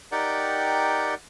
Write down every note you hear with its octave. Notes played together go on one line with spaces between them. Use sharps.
D#4 G4 A#4 D5 F#5 G5